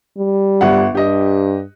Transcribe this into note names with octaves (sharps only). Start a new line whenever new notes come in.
G3
G1 F#5
G2 G4 D#5